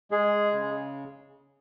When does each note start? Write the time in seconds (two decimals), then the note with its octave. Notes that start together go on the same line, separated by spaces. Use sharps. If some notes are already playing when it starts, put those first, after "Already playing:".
0.11 G#3 G#4
0.53 C#3